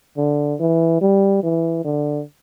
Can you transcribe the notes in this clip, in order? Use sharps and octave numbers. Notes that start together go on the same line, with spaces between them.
D3
E3
G3
E3
D3